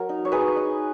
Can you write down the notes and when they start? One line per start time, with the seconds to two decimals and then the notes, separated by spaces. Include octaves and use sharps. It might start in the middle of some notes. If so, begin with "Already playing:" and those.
Already playing: F#3 A#4
0.09 D#4
0.25 C#5
0.32 D#4 G#4 B4
0.56 D#4